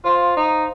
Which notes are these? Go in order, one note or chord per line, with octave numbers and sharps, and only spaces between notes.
F4 C5 F5 C6
D#4